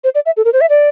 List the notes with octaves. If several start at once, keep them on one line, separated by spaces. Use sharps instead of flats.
C5
D5
E5
A4
A#4
C5
E5
D5